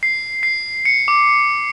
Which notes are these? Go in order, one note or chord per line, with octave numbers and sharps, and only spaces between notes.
C7
C7
C#7
D6